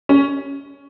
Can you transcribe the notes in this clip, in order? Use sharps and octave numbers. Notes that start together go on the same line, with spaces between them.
C#4